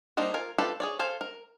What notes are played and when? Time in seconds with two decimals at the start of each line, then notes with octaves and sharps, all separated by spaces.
0.17 G3 A#3 D4 D#4 C5
0.34 F4 A#4 G#5
0.58 F4 G4 A4 B4 D5
0.80 G#4 C#5 D5
0.99 A4 C5 F5 G#5
1.21 A#4